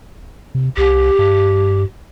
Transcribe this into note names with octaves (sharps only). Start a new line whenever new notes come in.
C3
C2 G4
G2